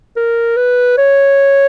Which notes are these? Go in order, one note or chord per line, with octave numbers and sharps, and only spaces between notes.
A#4
B4
C#5